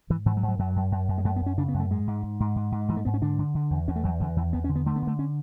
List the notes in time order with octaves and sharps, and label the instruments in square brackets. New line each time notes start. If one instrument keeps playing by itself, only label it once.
[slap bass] G#2 E3
G#2 E3
F#3
G#2
F#3
F#2 F#3
F#2
F#2
F#2
G#3
F#2 A3
B3
F#2 C#4
C#3 D4
B3
F#2
A3
G#2 G#3
G#2
G#2
G#2
G#2
G#2
G#2 E3
A3
G#2 B3
C#4
D3 D4
D3
D3
E2
E2 C#4
A3
E2 F#3
E2 D3
E2 E3
E2 B3
C#4
D3
B3
D3 A3
B3
D3 A3
C#4